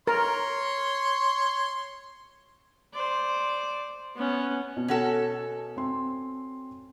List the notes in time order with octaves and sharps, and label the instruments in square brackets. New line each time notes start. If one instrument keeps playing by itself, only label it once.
[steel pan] A#4 [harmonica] C#5 C6
[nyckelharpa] C5 D5
B3 C#4
[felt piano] B2
[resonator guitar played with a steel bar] C#4 F#4 A4
[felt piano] C4 C6